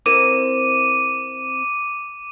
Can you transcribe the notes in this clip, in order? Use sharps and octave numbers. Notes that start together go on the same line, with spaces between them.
C4 E4 A#4 D6 D#7